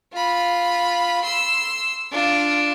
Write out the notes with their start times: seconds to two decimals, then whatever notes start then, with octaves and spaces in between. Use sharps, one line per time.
0.13 F4 B5
1.24 C6 E6
2.12 D4 F4